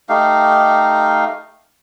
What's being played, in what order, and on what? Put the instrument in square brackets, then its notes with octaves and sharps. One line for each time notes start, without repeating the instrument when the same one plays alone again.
[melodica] A3 D#4 G4 F5